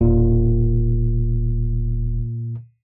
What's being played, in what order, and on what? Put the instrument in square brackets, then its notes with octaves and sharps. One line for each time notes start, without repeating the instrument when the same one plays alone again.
[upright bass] E1 [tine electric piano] A#2